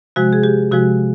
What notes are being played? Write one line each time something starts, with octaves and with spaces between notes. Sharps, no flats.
C3 F3 G#3 F#4
G#4
G4
C3 F3 G#3 F#4